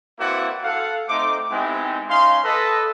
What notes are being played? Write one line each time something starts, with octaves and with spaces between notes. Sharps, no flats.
A#3 C4 E4 F#4 B4 D5
A4 F5 F#5
A3 C4 D#4 C5 D6
G#3 B3 C4 D#4 E4 G4
C#4 D#4 F5 C6
A4 B4 D#5